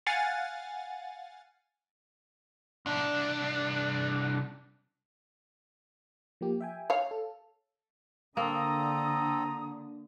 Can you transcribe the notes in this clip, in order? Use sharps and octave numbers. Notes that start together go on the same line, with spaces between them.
F5 F#5 G#5 A6
C2 D4
F3 A#3 G4
E5 G5 G#5
C#5 F5
A4
D3 A#3 C4 A4 A#5 D#6